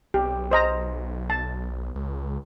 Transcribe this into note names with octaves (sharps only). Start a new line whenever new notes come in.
B1 G4
C5 D#5 A#5
A5
C#2